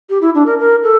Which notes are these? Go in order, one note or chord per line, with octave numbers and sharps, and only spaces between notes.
G4
E4
D4
A#4
A#4
A4